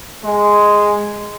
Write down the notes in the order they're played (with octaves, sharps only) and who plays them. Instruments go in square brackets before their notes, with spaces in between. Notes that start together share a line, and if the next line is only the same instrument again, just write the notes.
[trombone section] G#3